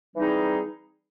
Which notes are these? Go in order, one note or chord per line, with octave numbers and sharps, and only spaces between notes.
E3 G3 C4 D#4 G#4